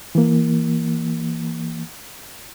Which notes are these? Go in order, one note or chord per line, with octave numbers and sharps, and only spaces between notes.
E3 A#3